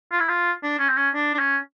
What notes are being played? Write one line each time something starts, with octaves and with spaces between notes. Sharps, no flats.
F4
E4
F4
D4
C#4
C4
C#4
D4
D4
C#4